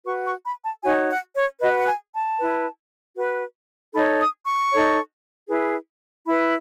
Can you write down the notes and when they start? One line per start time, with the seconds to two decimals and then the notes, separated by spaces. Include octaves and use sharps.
0.05 F#4 B4 C#6
0.25 C#6
0.45 B5
0.63 A5
0.83 D#4 F#4 C#5 G#5
1.09 F#5
1.36 C#5
1.61 F#4 B4 D#5
1.75 F#5
1.86 G#5
2.13 A5
2.39 E4 B4
3.16 F#4 B4
3.93 D#4 A4 C#5 B5
4.20 D#6
4.45 C#6
4.71 D#4 A4 C#5
5.49 E4 G#4 B4
6.26 E4 B4 B5